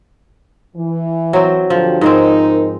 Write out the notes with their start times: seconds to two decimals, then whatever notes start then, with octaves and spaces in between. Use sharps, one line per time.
0.76 E3
1.33 F#3 C4
1.70 G2 D3 F3 F#3
2.01 G#2 G#3 C4 D#4 A#4